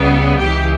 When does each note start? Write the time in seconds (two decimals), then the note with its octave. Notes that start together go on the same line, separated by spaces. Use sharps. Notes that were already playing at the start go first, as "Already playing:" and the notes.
Already playing: C#2 C#3 G3 B3
0.38 C#2 C#3 E3 G4